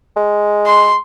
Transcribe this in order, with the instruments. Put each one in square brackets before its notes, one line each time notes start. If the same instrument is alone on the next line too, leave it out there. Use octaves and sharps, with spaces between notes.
[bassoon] G#3
[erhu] C6